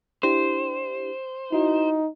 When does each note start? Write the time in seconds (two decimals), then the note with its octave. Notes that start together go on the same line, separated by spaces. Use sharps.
0.23 D4 E4 G4 C5
1.52 D#4 E4 F#4